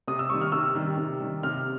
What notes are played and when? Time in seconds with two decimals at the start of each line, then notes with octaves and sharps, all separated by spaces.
0.08 C3 D#6
0.19 E6
0.30 D#3 G3 C#6
0.41 F6
0.52 C3 E6
0.75 D#3 G3
0.97 C3
1.20 D#3 G3
1.43 C3 F6